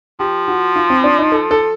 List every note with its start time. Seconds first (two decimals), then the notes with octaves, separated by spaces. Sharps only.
0.20 F3 G4
0.48 F#4
0.76 F4
0.90 C4
1.04 D4
1.19 D#4
1.32 A4
1.51 A4